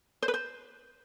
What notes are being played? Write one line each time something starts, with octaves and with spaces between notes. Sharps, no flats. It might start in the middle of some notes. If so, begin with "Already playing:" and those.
C5
B4
C5